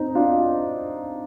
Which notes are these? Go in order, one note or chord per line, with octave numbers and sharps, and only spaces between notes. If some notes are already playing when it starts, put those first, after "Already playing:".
Already playing: C4 D#4
D4 F4